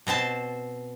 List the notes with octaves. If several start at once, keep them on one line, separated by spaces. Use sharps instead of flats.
B2 C4 C5 A5